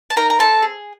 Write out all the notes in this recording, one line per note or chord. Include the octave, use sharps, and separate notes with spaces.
A5
D#4 A#4 A#5
A#5
C4 A4 A5
G#4